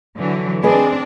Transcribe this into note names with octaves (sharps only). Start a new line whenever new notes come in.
D3 E3 F#3
C4 D4 G#4 B4 D#5